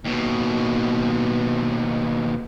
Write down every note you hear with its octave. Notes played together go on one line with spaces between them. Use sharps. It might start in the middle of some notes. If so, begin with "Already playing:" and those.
D#2 B2